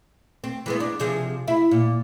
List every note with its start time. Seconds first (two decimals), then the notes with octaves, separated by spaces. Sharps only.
0.44 C4
0.66 E3 G#3 B3
0.80 D4
1.00 C3 F3 G#4
1.48 E4
1.71 A#2